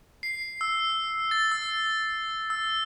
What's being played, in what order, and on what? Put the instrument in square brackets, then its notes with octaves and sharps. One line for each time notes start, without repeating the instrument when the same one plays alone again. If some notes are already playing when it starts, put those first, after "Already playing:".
[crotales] C7
E6
A6
E6
E6